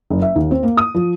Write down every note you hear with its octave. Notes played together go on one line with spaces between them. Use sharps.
F#1
E5
D#2
C4
A#3
D#6
F3